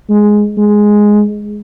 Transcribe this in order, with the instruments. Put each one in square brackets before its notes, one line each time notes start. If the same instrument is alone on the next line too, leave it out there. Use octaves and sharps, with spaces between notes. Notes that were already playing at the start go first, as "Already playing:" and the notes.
[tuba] G#3
G#3